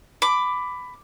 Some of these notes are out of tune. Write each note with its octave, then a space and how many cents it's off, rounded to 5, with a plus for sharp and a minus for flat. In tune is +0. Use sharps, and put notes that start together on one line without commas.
B5 +15 D6 +0